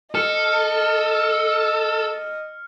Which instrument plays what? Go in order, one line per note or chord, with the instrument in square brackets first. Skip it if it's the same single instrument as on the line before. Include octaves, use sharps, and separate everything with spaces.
[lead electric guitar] A4 [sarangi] D#5 [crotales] F6 C#7